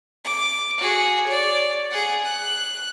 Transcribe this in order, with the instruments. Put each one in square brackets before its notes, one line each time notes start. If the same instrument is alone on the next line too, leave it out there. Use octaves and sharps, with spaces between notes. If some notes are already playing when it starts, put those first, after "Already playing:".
[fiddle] D6
F#4 G#4
C#5 D5
G#4 F#5
F#6